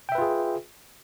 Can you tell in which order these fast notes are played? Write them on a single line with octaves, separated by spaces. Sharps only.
G5 E5 B4 F4 G#4